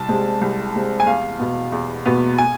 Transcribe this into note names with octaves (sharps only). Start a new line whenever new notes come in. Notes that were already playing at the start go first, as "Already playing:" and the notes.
Already playing: C2 A5
C3 G#3 C4
C2
C3 G#3 C4
G#5
E2 F5
B2 B3
E2
B2 B3
G#5